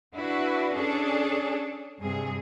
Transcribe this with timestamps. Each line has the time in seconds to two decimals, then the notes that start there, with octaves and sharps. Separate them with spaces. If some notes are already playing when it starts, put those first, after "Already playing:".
0.16 D4 E4 F#4 B4
0.75 C#4 D4 G#4 A4 D5
2.00 G2 C3 G#4